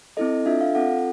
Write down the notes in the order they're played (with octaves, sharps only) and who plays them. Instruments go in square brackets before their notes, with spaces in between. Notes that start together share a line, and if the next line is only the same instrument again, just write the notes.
[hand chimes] C4 E4 A4 D#5
D4 F4 A4 E5
F5
C4 F4 A4 F#5